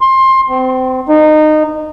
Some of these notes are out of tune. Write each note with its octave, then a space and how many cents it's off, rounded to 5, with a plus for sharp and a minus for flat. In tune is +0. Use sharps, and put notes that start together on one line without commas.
C6 +20
C4 -25
D#4 -20